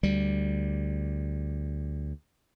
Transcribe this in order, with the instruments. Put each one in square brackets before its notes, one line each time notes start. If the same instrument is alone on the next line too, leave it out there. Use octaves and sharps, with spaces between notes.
[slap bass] D2 G3